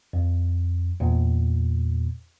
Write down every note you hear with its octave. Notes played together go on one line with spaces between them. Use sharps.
F2
E2 A#2